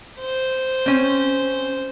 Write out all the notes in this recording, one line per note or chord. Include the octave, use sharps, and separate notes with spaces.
C5
C4 C#4